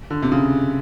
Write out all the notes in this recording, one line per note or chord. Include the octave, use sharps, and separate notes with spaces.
D3
C3
C#3